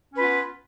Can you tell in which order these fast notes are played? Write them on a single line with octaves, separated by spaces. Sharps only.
C#4 B4 F4 B3